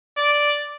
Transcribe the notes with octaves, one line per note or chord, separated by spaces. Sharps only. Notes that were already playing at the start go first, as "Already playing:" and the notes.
D5